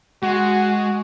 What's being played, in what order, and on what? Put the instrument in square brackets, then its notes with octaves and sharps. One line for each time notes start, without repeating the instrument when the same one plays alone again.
[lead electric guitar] G#3 [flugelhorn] F#4